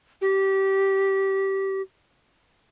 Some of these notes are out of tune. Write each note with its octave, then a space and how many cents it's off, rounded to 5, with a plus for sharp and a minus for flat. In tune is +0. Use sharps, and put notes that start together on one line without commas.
G4 -20